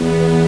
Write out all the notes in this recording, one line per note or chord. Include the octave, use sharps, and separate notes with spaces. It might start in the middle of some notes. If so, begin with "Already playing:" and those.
Already playing: E2 B3